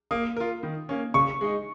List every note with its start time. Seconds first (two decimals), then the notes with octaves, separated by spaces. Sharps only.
0.11 A#3 D#6
0.37 F4 A#4
0.63 D#3
0.89 A#3 C#4
1.14 C#3 C#6
1.41 G#3 D#4